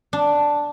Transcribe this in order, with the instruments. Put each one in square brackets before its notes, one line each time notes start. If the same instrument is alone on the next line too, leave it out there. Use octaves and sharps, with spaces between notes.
[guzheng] D4